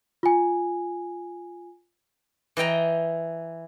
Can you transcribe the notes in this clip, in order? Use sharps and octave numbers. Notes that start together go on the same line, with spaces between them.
F4 G#5
E3 D#5 G5 A#5